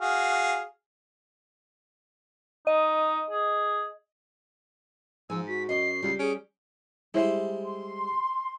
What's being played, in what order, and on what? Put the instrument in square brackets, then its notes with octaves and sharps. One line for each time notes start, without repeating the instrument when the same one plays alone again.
[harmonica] F#4 G#4 F5
[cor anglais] D#4 [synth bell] D#5
[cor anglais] G#4
[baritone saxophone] G#2 [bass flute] F3 [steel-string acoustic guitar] G#5 [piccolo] E6
[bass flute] F#4 [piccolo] B6
[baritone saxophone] F#2 [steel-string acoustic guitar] D#5 [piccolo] C7
[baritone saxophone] C#2 [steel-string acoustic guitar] G3
[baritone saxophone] C#4 [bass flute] G#4 [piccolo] D7
[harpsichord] G3 G#3 [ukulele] E4 C5 E5
[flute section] C6